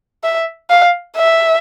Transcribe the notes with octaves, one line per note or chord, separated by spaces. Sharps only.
E5
F5
E5